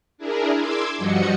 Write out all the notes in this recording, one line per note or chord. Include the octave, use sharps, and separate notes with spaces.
D4 E4 G#4 A#4
C6 D6 E6 G#6
G2 F3 G3 F#4 D#5 C#7